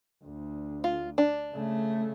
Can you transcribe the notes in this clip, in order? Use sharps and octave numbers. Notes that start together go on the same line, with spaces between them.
D2
F4
D4
C#3 A3